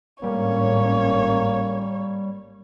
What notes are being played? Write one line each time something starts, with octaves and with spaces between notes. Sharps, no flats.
G#1 A2 G3 A#3 C#4 C#5